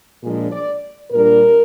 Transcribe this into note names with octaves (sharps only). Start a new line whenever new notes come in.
A#2 F3 G#3 D4 G#4
D5
A#2 G3 D4 A#4